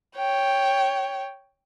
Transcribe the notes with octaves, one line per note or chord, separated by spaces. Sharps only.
C#5 G5